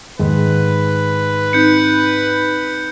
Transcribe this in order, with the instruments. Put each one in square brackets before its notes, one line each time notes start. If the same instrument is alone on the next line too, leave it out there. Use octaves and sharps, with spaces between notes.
[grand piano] G#2 D#3 [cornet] B4
[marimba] C4 D#4 [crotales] G6 C#7